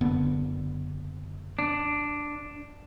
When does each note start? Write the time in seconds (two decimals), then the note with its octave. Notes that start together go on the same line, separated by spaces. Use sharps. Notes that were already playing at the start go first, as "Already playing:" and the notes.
0.01 F#1 D3 B3
1.59 D4